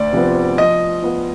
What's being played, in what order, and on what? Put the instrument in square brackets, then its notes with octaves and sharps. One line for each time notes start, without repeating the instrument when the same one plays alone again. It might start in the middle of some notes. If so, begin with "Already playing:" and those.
Already playing: [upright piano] D2 [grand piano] D5
[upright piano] C3 F3 B3
[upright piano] F3 [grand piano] D#5
[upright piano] B3 F4